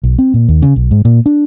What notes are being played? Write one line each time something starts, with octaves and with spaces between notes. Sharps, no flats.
B1
C4
A#2
D#2
C#3
B1
G#2
A#2
D4